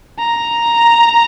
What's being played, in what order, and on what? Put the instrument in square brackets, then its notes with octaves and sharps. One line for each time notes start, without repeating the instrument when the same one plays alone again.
[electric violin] A#5